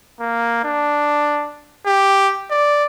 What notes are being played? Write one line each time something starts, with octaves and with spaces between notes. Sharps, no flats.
A#3
D4
G4
D5